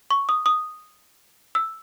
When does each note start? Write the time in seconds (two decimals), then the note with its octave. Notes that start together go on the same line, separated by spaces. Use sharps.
0.11 C#6
0.29 D#6
0.46 D#6
1.55 E6